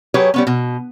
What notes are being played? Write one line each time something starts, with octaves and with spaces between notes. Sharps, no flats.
F#3 G4 G#4 B4 C#5
G3 B3 C#4
B2